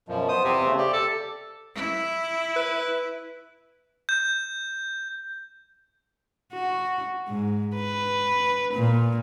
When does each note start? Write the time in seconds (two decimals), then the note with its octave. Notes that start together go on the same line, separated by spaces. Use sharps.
0.09 F#2 B2 F3
0.28 B3 C5 D#6
0.44 E2 C3 C4
0.66 C#3 A3
0.78 G4 D5
0.93 A4
1.75 E4
2.56 B4
4.09 G6
6.53 F#4
7.28 G#2
7.76 B4
8.74 A#2